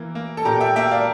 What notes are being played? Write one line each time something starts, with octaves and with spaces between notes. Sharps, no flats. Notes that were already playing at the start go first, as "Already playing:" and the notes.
Already playing: E3 A#3
A#3
A4
A#2 G4 A#4
E5 G5
A#3 E5 G5
D5 F5